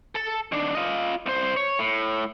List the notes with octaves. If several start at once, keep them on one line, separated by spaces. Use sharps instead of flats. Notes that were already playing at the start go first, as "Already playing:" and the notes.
A4 A5
D#3 D4
F4 D#5
C2 C5
C#5
A2